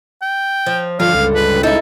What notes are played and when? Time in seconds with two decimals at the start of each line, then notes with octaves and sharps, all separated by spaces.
0.22 G5
0.66 F3
1.00 G2 D3 F3 F5
1.14 C#2
1.35 B4
1.63 D#4 E4 A4